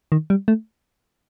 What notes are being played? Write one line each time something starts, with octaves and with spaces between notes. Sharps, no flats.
D#3
G3
A3